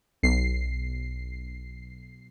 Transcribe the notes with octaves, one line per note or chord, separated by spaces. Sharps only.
B1 C7